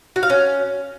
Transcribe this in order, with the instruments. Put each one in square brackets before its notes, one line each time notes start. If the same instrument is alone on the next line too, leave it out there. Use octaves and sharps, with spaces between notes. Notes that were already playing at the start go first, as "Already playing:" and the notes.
[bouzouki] F#4
F5
C#4